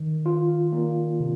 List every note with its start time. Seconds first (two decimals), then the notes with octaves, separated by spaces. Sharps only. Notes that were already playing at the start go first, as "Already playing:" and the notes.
Already playing: D#3
0.26 F4
0.72 A#3
1.20 C3